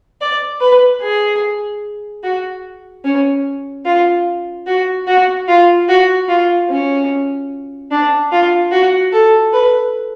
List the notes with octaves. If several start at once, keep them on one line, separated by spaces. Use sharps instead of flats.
D5
B4
G#4
F#4
C#4
F4
F#4
F#4
F4
F#4
F4
C#4
D4
F4
F#4
A4
B4